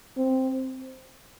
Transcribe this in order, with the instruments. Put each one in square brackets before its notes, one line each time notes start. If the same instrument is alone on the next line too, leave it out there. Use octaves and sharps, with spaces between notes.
[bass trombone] C4